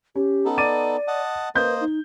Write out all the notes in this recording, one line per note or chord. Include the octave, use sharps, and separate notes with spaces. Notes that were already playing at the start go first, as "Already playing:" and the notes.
C#4 G4
B3 D#4 A4
D5 D6 A6 D#7
D#5 F#5 A5
A#3 B4 C5 D#5 G6
D#4